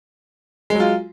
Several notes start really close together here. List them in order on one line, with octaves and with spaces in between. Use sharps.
G#3 F#3 F4